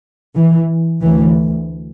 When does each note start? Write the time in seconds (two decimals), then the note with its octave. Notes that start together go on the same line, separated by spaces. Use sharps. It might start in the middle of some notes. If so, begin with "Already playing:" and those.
0.36 E3
1.02 D2 E3